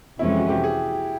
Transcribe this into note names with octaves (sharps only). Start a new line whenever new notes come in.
F2 C3 E3 G#3 C#4 E4
F#4
G4
G#4